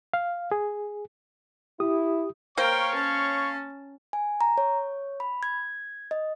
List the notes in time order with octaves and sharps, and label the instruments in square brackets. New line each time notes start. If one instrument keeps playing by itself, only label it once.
[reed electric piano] F5
G#4
[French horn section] E4 [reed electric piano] G4 D#6
[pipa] A#3 C5 [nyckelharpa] A#4 G5 [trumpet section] C#5 F5 C#6
[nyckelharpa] C#4 A5
[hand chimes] G#5
A#5
C#5
B5
G#6
D#5